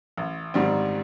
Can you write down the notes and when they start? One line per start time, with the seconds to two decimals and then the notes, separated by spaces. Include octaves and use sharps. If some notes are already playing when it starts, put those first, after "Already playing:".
0.17 A1
0.54 G#2 D#3 G3 C4